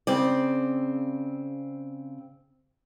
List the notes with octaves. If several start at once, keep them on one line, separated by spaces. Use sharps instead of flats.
C#3 C4 D5